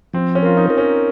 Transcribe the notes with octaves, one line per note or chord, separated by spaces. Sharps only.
F3 C4
C#4
F4 A#4
D#4
A#4
C#4